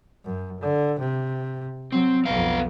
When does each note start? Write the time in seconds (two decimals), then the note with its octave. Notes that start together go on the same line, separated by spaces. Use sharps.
0.24 F#2
0.60 D3
0.99 C3
1.92 F#3 C4
2.26 B1 F2 B3 F5